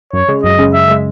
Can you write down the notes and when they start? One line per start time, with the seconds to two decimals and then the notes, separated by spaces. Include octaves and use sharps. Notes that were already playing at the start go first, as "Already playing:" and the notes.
0.13 F#2 C#5
0.28 C#3 G#3
0.44 F#2 D#5
0.59 C#3 G#3
0.73 F#2 E5
0.88 C#3 G#3